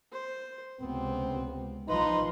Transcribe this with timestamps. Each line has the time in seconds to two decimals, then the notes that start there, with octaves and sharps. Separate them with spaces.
0.12 C5
0.80 C#2 C3 B3 C4
1.88 A#1 F3 D#4 B4 A#5 C6